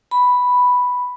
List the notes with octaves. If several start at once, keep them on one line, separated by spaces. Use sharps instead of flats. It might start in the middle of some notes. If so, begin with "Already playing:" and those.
B5